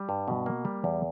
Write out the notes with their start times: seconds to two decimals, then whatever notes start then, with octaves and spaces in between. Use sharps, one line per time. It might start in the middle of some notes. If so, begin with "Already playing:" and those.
Already playing: G3
0.09 G2
0.28 B2
0.46 A#3
0.65 G3
0.84 E2